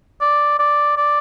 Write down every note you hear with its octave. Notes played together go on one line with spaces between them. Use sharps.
D5
D5
D5